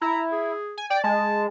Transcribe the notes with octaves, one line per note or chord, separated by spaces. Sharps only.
E4 A#5
G#4
G#5
D5 G5
G#3 A5